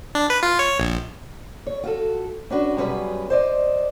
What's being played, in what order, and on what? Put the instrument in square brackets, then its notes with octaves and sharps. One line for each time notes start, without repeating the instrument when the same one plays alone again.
[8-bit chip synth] D4
B4
F4
C#5
A#1
[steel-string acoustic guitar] C#5
F4 F#4 A4
C#4 D4 F#4 B4
F#2 B2 G3 C#4 G#4 B4
C5 D5 D#5